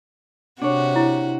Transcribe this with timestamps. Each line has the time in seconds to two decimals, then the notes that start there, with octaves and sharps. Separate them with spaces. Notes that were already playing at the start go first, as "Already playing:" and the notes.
0.62 C3 D4 F#4 C#5
0.96 E4